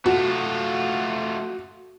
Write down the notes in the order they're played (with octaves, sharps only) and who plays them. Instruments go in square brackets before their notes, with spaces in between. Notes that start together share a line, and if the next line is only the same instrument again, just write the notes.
[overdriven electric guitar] A3 F4 [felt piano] F#4